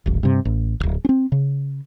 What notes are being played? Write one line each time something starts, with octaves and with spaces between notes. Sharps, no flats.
D1 G#1
G2 C3
A1
D1 G#1
C4 C#4
C#3